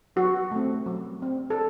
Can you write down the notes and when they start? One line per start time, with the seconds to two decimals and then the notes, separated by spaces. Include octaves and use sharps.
0.16 F#3 F#4
0.51 A3 C4
0.86 F#3
1.22 C4
1.50 A4